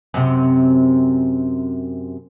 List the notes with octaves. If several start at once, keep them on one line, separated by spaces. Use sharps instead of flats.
F#2 C3